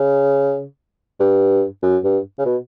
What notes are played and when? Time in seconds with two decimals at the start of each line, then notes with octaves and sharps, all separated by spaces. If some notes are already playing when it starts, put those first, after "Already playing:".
Already playing: C#3
1.20 G2
1.83 F#2
2.04 G2
2.39 C#3
2.46 B2